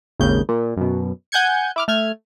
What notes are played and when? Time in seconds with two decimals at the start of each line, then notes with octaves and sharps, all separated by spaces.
0.20 G#1 D#2 C#3 G6
0.49 A#2
0.77 F#2 B2
1.32 F#5 G#5 G6 G#6 C#7
1.76 E4 D6 F6
1.88 A3 F6 G#6